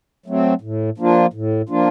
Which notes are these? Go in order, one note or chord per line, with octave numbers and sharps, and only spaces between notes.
F#3 A3 C4
A2
F3 A#3 D4 F4
A2
F3 A#3 D4 F4